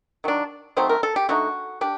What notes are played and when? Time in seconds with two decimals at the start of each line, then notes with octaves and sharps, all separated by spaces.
0.24 D#3 F#3 D4
0.77 F#3 A3 C4 D#4 C5
0.89 A#4
1.03 A4
1.16 G4
1.29 D3 A3 D#4 F#4
1.81 D4 G4